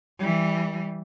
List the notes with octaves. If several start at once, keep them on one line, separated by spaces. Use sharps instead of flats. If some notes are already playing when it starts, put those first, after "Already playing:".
E3 G3